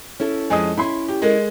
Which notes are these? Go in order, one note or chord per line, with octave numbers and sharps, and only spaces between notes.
C#4 E4 A4
F2 G#3 D#5 G#5 D#6
C#4 E4 B5 C6
G4
G#3 A4 A#4 D#5